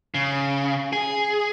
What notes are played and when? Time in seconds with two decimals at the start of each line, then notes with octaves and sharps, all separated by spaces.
0.14 C#3
0.93 G#4